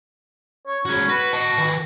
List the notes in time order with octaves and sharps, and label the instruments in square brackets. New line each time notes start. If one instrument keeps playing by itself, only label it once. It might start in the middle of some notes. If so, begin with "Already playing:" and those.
[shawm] C#5
[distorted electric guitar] G#3 F#4 [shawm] C#4
[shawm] F#4 [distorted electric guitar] B4
[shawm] F#4 [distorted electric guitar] D#5 A5
[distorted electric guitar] D#3 B4